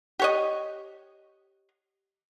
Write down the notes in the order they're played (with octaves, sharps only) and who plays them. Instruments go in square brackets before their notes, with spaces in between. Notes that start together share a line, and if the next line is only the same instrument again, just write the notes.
[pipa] G4 C#5 D#5